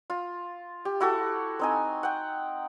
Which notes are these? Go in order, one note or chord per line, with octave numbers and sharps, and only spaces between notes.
F4
G4
E4 F#4 G4 A4
C4 D#4 G#5
F#5 G5